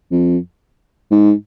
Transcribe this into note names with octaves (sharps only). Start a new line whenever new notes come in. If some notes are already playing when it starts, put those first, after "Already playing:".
F2
G#2